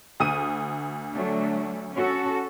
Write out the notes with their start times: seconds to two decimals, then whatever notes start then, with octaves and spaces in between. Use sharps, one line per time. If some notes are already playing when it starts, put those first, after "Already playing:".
0.20 D2 D#6 D#7
1.13 F#3 A3 D4
1.96 C#4 F#4 A4